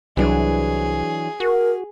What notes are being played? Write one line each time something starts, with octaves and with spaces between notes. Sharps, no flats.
C2 E3 F#3 D4 G#4
F#4 A#4